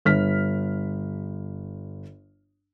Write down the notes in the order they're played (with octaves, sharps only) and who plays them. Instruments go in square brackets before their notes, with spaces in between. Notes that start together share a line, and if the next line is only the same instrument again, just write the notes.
[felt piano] G1 F6 B6